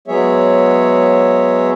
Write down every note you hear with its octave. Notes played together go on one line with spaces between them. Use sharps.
F#3 G#3 B3 G#4 C#5 E5